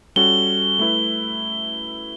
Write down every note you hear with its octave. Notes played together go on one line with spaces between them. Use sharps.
G3 C#4 F#4 A4 G7
A3 E4 B4